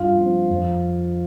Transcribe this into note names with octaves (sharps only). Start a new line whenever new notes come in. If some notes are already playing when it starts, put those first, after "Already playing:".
Already playing: G2 F4 F5
F3 C4
F2